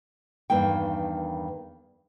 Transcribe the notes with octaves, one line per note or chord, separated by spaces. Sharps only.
E2 G2 D#3 A#3 G5